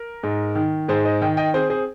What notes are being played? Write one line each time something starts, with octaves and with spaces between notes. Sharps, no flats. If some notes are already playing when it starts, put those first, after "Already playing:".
Already playing: A#4
G#2
D#3
G#2 G#4 C5
C5 D#5
D#3 D#5 G5
D#5 G5
C4 G#4 C5
G#4 C5